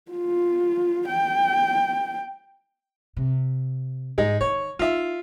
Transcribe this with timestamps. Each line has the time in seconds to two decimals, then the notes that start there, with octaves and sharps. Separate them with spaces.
0.11 F4
1.07 G5
3.17 C3
4.18 G#2 G#3 D#4
4.41 D#3 C#5
4.79 D#4 F4 E5